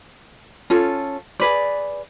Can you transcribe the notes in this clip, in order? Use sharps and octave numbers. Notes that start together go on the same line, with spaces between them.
C#4 F4 A4
G#4 B4 D5